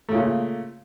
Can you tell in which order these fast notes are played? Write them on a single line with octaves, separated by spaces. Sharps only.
A3 C#3 A#2